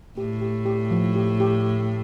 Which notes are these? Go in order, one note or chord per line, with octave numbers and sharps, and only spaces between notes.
A2 G4
G4
G4
F3
G4
G4